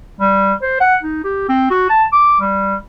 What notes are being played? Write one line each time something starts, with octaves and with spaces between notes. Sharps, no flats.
G3
C5
F#5
D#4
G4
C4
F#4
A5
D6
G3